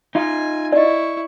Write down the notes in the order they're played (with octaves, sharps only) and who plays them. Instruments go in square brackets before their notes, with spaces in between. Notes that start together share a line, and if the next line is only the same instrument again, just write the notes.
[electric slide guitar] D#4 F4 [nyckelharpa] G#5
[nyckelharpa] E4 C#6 [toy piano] D5 D#5